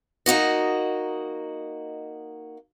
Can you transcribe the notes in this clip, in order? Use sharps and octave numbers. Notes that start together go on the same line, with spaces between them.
A#3 D#4 F#4 D#5